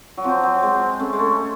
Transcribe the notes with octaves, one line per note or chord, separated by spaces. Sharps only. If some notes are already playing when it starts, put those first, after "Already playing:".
F#3
F3 C4
F#3
G#3
A3 C#4
G#3
A3